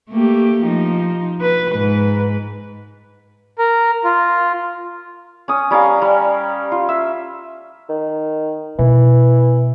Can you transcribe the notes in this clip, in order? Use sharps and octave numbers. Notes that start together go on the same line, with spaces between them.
A3 A#3 G4
F3 D#4
B4
G#2 B4
A#4
F4
C#4 D#6
G3 C#4 A#4 F5
G3
F4
E5
D#3
B2 E3